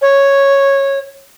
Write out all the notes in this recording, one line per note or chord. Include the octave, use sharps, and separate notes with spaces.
C#5